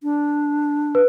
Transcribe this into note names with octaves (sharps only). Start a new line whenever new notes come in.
D4
B4